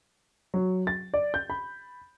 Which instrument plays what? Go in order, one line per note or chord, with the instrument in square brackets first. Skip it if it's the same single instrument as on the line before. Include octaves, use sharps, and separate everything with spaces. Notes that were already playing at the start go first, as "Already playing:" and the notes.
[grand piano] F#3
A6
D5
G6
B5